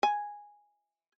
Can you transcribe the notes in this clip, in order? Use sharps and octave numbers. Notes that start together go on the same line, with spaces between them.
G#5